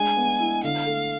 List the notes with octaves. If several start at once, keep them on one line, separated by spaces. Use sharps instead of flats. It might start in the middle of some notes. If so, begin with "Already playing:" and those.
Already playing: G#3 D4 G#5
B3
E4
D3 F5
A3